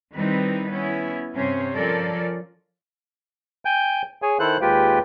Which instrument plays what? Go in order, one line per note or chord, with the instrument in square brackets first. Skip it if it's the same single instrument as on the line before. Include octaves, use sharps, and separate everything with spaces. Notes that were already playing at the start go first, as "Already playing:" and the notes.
[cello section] D#3 G3 C4 D#4 E4 B4
B3 C#4 E4
G2 C3 C#4 C5 C#5
F3 C#4 A4 A#4 D5
[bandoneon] G5 G#5 G6
G#4 C#5 G#5
D#3 E4 A4 C5 F#6
D#2 G#3 F4 G4 B4 G5